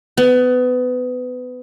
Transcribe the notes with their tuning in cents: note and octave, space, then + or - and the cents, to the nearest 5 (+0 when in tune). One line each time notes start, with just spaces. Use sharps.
B3 +25